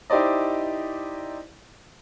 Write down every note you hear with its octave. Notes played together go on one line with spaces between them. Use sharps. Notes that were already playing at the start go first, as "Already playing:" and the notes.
D#4 E4 G4 C5 D5 D#5